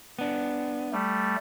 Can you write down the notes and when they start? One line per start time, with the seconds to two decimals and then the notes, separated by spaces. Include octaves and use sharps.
0.19 B3 D4
0.92 G3 A3